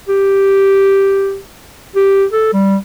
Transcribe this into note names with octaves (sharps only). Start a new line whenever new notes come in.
G4
G4
A4
G3